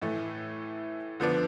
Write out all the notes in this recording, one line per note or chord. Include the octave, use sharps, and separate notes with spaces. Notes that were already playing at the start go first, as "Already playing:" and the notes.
A2 E3 A3
D3 F3 B3 D4